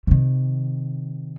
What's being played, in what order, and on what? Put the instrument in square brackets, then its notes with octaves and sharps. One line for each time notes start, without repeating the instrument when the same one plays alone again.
[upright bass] C3 D#3